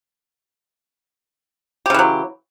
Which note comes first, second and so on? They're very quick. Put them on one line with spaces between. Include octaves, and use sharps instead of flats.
G4 C#3 E3 F#3